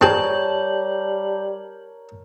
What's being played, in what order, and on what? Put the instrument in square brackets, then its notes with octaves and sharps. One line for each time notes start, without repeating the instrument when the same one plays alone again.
[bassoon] G3 [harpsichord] C4 G#4 [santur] A#4 C#5 [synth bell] A5 G6 F#7